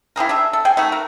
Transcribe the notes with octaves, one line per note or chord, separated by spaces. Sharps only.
E4 G4 G#4 A#4
D4 G#4 E5
A4
G#4 G5 G#5
A3 D#4 F#4
A#4